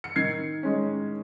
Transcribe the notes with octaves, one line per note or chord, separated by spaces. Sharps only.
C#7
D#3 G#6 C7
G#3 C#4